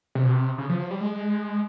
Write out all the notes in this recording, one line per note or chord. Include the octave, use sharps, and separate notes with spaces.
C3
B2
C3
C#3
F3
F3
G3
G#3